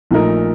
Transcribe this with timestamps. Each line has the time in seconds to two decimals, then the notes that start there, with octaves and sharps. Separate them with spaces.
0.11 A#1 A#2 A3 D#4 A#4